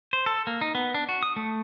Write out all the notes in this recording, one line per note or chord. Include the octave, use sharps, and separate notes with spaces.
C5
A4
A#3
D#4
B3
D4
F#4
D#6
A3